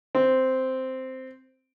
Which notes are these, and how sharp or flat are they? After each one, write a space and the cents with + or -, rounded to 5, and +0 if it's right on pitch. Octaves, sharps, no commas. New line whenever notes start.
C4 -5